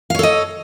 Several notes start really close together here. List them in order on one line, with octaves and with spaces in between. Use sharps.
F5 C#5 A4 D#5